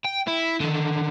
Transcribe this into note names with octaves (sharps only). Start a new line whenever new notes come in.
G5
E4
D3 D#3